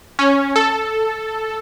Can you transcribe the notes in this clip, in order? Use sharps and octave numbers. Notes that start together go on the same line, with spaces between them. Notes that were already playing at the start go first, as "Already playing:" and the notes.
C#4
A4